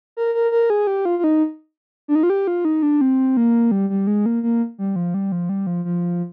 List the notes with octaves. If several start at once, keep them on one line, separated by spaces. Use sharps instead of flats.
A#4
A#4
A#4
G#4
G4
F4
F4
D#4
D4
D#4
F4
G4
F4
D#4
D4
C4
A#3
G3
G3
G#3
A#3
A#3
G3
F3
G3
F3
G3
F3
F3